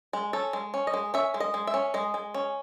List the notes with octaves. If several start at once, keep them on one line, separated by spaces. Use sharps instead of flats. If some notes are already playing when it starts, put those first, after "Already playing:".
G#3
C#4 A4
G#3
C#4
D#5
G#3
C#4 E5
G#3
D#5
G#3
E5
C#4
G#3 D#5
G#3
C#4